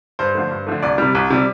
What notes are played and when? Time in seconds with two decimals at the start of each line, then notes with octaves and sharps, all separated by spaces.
0.19 G2 C5
0.35 D3 F3 A3
0.51 G2
0.67 D3 F3 A3
0.82 C2 D5
0.98 C3 G3
1.15 C2
1.30 C3 G3